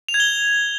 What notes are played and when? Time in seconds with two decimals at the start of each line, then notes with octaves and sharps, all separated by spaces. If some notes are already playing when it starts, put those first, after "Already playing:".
0.09 F7
0.14 G#6
0.20 G7